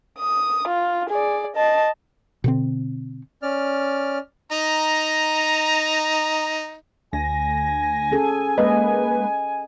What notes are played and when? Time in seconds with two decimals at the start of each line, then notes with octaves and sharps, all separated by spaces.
0.20 D#6
0.68 F4
1.10 G#4 D5
1.56 D#5 A5
2.44 B2 D3 C4
3.42 C#4 D5 F6
4.52 D#4 A#5
7.13 D2 G#5 A#6
8.11 C#4 G#4 A4
8.58 G#3 A#3 B4 D#5